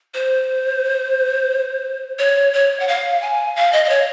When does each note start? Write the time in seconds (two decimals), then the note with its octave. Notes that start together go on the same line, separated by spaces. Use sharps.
0.14 C5
2.19 C#5
2.53 C#5
2.80 F#5
2.88 F5
3.21 G#5
3.56 F5
3.72 D#5
3.85 D#5
3.89 C#5